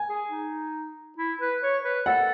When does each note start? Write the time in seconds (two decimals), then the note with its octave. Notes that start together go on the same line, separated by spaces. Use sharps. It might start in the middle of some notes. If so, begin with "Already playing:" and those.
Already playing: G#5
0.09 G#4
0.31 D#4
1.18 E4
1.41 B4
1.63 C#5
1.85 B4
2.06 A4 F#5